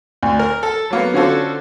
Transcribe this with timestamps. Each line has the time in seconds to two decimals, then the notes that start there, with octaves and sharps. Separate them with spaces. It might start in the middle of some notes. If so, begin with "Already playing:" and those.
0.23 D2
0.39 A#4
0.63 A4
0.91 F#3 A#3 B3
1.14 D3 C#4 F4 F#4 A4 C5